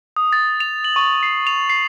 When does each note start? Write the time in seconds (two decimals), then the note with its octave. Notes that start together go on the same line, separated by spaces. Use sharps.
0.16 D#6
0.33 A6
0.60 F7
0.84 F#7
0.96 C#6
1.23 C7
1.47 F7
1.70 C7